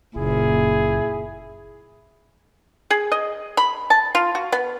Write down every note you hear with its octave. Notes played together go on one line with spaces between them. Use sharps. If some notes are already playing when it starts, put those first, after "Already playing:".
F#1 A#2 E4 G#4
G#4
D#5
B5
A5
F4
F#4
B3